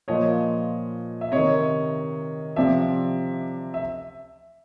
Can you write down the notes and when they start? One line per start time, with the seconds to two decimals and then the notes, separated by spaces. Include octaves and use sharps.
0.08 A#2 F3 C#5 D#5
1.21 E5
1.32 C3 D#3 C#5 D#5
2.56 C3 F3 D5 E5
3.74 E5